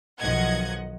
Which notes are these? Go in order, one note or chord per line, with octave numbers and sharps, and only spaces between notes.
B1 D#3 F3 D#5 F#5 G#6